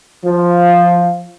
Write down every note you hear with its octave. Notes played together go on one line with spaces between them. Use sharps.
F3